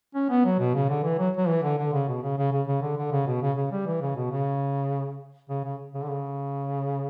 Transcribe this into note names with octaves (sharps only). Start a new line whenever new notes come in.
C#4
B3
F#3
B2
C#3
D3
E3
F#3
F#3
E3
D3
D3
C#3
B2
C#3
C#3
C#3
C#3
D3
D3
C#3
B2
C#3
C#3
G3
E3
C#3
B2
C#3
C#3
C#3
C#3
D3
C#3